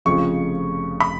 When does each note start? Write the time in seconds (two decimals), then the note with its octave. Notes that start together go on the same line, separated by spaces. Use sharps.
0.05 F1 F2 C#3 F3 C#6
1.00 B5